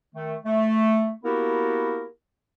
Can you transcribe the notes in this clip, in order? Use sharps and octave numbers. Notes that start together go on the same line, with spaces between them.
D#3 A3
A3
A#3 B3 E4 F#4 G4 A#4